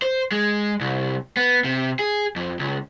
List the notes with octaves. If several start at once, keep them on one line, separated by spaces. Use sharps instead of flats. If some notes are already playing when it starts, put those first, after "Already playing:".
C5
G#3
C2
B3
C3
G#4
F2
C#2